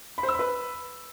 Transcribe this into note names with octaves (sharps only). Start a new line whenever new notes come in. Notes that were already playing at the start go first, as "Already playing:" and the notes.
B5
C5
E6
B5
B4